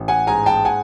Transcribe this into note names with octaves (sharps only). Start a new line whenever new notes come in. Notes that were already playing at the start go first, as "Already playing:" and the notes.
Already playing: A1
F#5 G#5
G#2 G#5 A#5
G5 A5
F#5 G#5